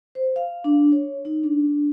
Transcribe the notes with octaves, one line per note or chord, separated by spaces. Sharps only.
C5
F5
D4
C#5
D#4
D4